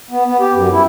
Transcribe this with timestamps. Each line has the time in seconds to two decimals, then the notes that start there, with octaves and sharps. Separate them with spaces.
0.11 B3
0.26 B3
0.40 G4
0.54 F#2
0.72 E4